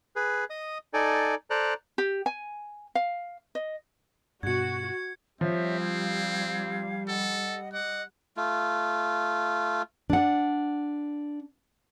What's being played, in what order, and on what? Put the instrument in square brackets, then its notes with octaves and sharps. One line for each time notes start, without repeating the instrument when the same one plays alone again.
[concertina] G#4 B4
D#5 D#6
D#4 A4 D5 G#5
A4 C5 D5 A#5 F#6
[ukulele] G4
G#5
F5
D#5
[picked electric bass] G2 B2 [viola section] F#4 [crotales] G#6 C#7
[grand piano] F3 [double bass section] G3 [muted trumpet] C4 [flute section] C#5 E5
[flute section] F4 F5 G#6
[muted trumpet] A4 [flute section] D#5 F#5
[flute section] D#5 D6 [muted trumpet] F#5
[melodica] A3 F4
[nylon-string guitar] D4 F#5